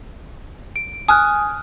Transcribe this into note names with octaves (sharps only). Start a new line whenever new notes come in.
D7
G#5 D#6 F6 F#6